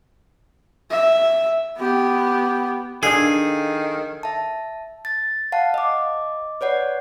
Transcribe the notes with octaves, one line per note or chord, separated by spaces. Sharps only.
E5
B3 G4
D#3 D4 G#4 A4 F5
E5 A5
A6
F5 F#5 A5
D#5 D6
B4 C#5 D5 F#5